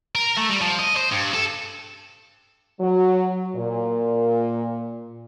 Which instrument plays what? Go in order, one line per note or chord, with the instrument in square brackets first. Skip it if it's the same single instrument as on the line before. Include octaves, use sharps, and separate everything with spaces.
[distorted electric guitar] A#4
A3
G3
F3
D#5
C5
G2
A4
[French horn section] F#3
A#2